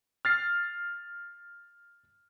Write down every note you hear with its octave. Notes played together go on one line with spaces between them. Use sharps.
F6 A6 C7